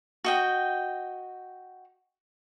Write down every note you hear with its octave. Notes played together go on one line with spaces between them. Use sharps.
F#4 D#5 G5